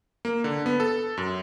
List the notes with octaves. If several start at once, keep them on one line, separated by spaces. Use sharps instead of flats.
A#3
D3
B3
A4
F#2